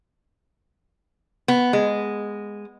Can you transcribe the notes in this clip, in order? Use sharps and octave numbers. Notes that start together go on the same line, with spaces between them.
B3
G#3